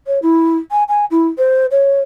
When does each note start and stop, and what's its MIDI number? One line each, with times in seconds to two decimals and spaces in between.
0.07 0.19 73
0.22 0.56 64
0.71 0.84 80
0.88 1.05 80
1.11 1.28 64
1.38 1.66 72
1.71 2.00 73